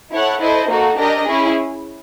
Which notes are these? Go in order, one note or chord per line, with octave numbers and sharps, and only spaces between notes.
E4 A4 C#5 F#5
E4 A4 C5 D#5
A#3 D#4 F#4 A4
D4 G4 A#4 D#5
C#4 E4 G#4